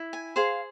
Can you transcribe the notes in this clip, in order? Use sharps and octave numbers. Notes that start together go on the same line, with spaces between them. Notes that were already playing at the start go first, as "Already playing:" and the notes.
Already playing: E4
G#5
G#4 C5 F5